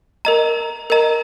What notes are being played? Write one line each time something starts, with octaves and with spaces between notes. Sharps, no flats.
A#4 D#5 A#5
A#4 D#5 A#5